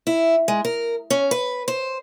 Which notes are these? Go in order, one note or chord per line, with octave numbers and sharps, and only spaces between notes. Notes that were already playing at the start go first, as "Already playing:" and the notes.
E4
G#3
A#4
C#4
B4
C5